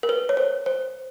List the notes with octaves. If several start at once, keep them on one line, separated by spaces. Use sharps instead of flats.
A#4
B4
C#5
C5
C5